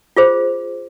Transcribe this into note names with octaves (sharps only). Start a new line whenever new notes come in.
F4 G#4 C5